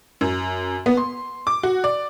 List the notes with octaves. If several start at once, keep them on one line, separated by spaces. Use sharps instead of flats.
F#2
B3
C6
D6
F#4
D5